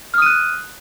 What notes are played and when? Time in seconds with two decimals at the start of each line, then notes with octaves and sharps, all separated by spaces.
0.14 F6
0.18 D#6
0.22 D#7
0.26 F#6